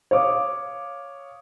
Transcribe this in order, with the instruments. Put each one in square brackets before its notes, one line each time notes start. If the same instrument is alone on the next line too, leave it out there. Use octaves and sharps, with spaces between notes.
[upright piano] C#5 F5 D6 D#6